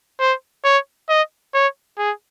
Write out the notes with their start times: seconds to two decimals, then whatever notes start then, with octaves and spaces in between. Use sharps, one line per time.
0.20 C5
0.64 C#5
1.09 D#5
1.54 C#5
1.98 G#4